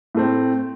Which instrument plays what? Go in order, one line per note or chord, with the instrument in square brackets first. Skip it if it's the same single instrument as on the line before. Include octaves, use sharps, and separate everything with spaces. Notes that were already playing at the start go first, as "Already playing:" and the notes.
[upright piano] A2 A3 C4